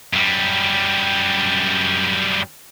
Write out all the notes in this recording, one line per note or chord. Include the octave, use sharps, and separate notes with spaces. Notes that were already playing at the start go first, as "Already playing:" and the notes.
F#2 G3